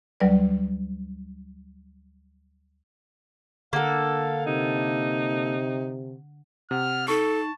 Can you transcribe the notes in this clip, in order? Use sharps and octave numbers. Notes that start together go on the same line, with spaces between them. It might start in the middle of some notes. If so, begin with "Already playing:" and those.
D2 F#3 G3 B4 D5
D3 A#3 A4 F5 F#5
C3 D#4
C3 F#5 F6
D#4 A4 A5 C#6